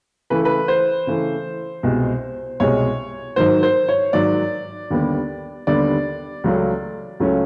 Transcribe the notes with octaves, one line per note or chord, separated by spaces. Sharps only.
C#3 E3 A3 B4
B4
C5
C#3 E3 A3
C2 B2 G#3
C2 B2 G#3 C#5
G#2 D#3 F#3 C5
C5
C#5
G#2 D#3 F#3 D5
D#2 D3 G3 B3
D#2 D3 G3 B3 D5
C#2 C#3 F#3 A3 C#4
C#2 C#3 F#3 A3 C#4